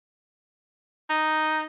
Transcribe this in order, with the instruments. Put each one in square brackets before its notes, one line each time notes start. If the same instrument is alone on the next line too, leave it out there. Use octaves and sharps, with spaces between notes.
[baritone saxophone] D#4